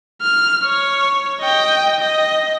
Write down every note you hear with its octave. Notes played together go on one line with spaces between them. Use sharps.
F6
C#5
D#5 G5
D#5